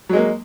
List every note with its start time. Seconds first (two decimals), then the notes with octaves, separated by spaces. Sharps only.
0.09 F#3
0.13 G#3
0.16 A#3